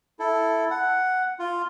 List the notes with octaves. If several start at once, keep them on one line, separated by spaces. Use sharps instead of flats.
E4 A4
F#5
F4